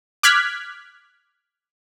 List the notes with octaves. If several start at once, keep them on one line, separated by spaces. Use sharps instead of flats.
D6 F6 F#6 G#6 B6